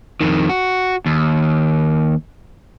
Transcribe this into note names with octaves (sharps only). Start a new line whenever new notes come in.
F2 D#3
F#4
D#2